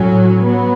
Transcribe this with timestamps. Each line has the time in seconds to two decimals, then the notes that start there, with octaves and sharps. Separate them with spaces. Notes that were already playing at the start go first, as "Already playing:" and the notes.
Already playing: A2 F#3 C#4
0.44 F#3 B3